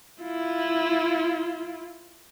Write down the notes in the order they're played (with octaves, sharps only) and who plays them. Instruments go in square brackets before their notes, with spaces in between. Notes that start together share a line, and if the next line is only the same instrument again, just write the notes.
[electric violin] E4 F4